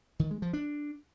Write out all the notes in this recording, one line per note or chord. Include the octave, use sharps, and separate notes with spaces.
D#3
G#3
F3
D4